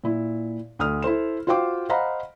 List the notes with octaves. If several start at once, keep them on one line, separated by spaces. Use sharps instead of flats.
A#2 E4
D2 D#6 F6
E4 A4 C5 E7
F4 F#4 C5 F5 G5 D6
C5 D#5 F5 F#5 A#5 B5